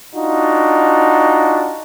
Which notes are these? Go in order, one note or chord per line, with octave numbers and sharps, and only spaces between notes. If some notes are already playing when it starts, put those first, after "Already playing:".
D4 D#4 F4 F#4